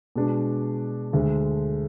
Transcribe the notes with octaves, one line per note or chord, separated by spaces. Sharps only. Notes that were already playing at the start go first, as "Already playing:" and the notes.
B2 G#3 D4
D2 D3 G#3